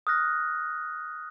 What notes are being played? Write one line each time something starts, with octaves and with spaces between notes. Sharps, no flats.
D#6 F6 F#6 A#6